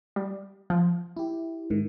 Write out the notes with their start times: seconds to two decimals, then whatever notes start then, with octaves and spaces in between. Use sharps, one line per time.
0.16 G3
0.70 F3
1.17 E4 G4
1.70 G#2 D#3